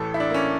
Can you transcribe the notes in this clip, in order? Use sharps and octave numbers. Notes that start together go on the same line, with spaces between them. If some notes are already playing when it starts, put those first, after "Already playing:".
Already playing: A1 A2 E3 A4
E4
D4
A#3
C#4